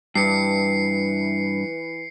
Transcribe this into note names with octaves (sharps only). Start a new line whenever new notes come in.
G2 E3 E4 B4 C7 C#7